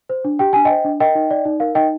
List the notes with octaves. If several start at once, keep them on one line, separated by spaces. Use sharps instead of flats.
C5
D4
G4 G5
D4 G#5
C5 D#5 G5
D4
A#4 D#5 G5
D#4
D5
D#4
A#4 F5
D#4 D#5 G5